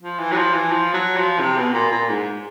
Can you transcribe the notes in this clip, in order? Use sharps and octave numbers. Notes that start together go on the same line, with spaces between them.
F3
E3
F#3
F3
E3
F3
F#3
F3
C3
B2
A#2
A#2
G#2